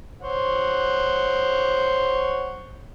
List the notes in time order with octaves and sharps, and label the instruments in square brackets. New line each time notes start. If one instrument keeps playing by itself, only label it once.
[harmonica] C5 C#5 F#5